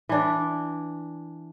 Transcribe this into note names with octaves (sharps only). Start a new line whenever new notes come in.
E3 D4